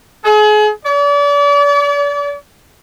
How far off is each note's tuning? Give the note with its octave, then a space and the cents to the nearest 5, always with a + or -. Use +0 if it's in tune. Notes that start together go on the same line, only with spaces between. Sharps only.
G#4 +35
D5 -40